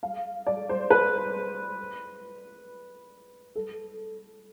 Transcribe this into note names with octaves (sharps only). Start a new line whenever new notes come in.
F5
D5
C5
B4
A4